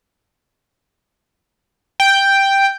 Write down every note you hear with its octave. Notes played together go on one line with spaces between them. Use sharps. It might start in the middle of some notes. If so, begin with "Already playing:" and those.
G5